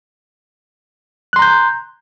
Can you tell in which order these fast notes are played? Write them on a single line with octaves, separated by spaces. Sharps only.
F#6 C6 A#5 G6